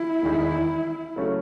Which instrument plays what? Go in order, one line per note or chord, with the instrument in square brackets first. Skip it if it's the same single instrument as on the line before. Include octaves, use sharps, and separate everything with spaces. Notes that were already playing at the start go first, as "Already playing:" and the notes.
Already playing: [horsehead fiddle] E4
[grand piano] E1 E2 D#3 G#3 D#4
C#3 F#3 A3 C#4